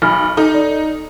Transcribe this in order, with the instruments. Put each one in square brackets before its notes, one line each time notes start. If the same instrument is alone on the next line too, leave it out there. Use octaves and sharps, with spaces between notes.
[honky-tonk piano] B1 [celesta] B5 F6
[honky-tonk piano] D#4 [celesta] A4
[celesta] D5